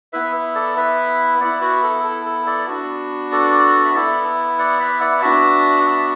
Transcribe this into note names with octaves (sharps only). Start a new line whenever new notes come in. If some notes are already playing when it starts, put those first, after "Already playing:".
B3 E4 B4 E5
A4 D5
B4 E5
B3 E4 D5 F#5
F#4 B4
A4
A4
A4
A4 D5
B3 D4 F#4
A4 D5
E5
B3 E4 A4 D5
D5 F#5
B4 E5
D5 F#5
B3 D4 F#4 E5 A5
E5 A5